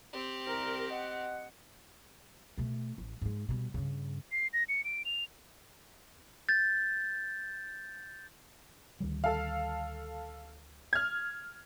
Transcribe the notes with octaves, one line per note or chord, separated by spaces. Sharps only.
C4 G4
C2 A#4
D#5 F#5
B2 A3
A1
G#2 G#3
B2 G3
G2 C#3
C7
A#6
C#7
D7
F7
G6 A6
D2 D#3 G3
A4 F5
F6 G#6